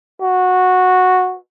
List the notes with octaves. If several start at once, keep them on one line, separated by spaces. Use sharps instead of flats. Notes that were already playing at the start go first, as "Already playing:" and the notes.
F#4